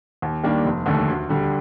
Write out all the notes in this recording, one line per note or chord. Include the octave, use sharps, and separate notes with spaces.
D#2
D#3 G3 A#3 D4
F1
D#2 D3 A3
D2
D3 G3